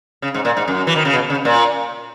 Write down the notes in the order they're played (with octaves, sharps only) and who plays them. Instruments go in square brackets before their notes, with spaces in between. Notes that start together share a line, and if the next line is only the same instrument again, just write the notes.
[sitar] C#3
G#2
A#2
G#2
F#2
E3
D#3
C#3
B2
C#3
A#2